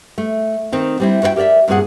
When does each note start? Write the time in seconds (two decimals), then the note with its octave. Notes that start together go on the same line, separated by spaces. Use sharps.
0.18 A3
0.72 D#3 C4 D#4
1.00 G3 C4 E4
1.22 F#4 A#4 B4 E5 G5
1.36 G4 A#4 C5 D5 E5
1.68 G2 A#2 G#3 C4 G#4 F#5